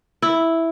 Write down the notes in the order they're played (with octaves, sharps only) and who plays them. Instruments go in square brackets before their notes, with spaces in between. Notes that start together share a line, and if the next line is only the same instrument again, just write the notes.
[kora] E4